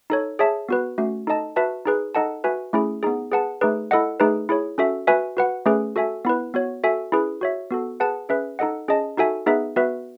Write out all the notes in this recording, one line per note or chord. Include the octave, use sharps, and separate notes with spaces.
D#4 A4 C#5
G#4 C#5 E5 A5
B3 F#4 B4
A3 C#4 F#4
D#4 A4 D#5 A5
F#4 B4 E5 A5
D#4 G#4 B4
D#4 A4 D#5 F#5 A5
F#4 B4 E5 G#5
A3 C#4 E4 G#4
B3 D#4 G#4
G#4 B4 F#5 A5
A3 D#4 G#4 B4
E4 A4 D#5 F#5
A3 D#4 G#4 B4
E4 G#4 C#5
C#4 F#4 A4 E5
F#4 B4 E5 G#5
F#4 B4 F#5
A3 C#4 G#4 B4
F#4 A4 E5 G#5
B3 E4 B4
B3 F#4 C#5
F#4 A4 E5 G#5
C#4 E4 G#4 B4
F#4 C#5 E5
B3 F#4 A4
G#4 B4 F#5 A5
C#4 G#4 B4 E5
D#4 A4 D#5 F#5
C#4 G#4 D#5 A5
D#4 F#4 A4 E5 G#5
B3 D#4 G#4 B4 E5
B3 F#4 B4 E5